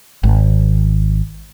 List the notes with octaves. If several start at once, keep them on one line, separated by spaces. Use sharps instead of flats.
G#1